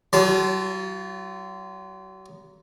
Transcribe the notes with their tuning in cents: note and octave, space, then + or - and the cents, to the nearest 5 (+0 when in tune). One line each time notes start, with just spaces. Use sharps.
F#3 +40 F4 -20 A5 -10